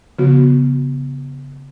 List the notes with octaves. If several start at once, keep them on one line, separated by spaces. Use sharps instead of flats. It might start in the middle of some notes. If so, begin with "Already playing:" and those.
C#3 F3 B3 F#4